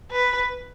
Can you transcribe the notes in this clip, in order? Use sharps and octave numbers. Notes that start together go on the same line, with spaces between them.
B4